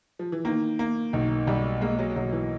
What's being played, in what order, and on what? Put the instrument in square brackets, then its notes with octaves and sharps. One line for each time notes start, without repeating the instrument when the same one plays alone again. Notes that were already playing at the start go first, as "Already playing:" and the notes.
[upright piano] F3
E3
[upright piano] D#3 [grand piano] A#3
[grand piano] A#3
[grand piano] B1 [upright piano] D#3
[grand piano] B1 [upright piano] G3
[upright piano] G#3 [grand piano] A#3
[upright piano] F#3
[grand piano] B1 [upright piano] F#3
[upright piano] E3